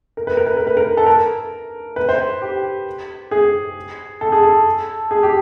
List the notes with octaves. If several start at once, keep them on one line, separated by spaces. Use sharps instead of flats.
A#4
B4
A#4
B4
A#4
B4
A#4
A4
A#4
B4
C5
G4
G#4
A4
G#4
A4
G#4
G4